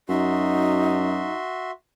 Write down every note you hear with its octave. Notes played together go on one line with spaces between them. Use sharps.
F#2 D#4 F#4 E5 C6